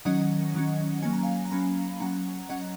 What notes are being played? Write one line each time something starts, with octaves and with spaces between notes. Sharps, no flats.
D#3 F#3 C#4 D#5 F#5
D#3 F#3 C#4
F#3 A#3 C#4 G#5
A#5
F5 G#5
A#5
F#3 A#3 C#4 G#5 B5
F#3 C#4 F#5 A#5
F#3 C#4 D#5 F#5